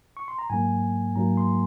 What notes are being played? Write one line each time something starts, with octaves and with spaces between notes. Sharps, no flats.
C#6
C6
A#5
G#2 F#3 A#3 G#5
G#2 F#3 A#3 A#5
C6